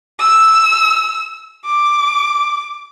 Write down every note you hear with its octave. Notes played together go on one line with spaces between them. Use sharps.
E6
D6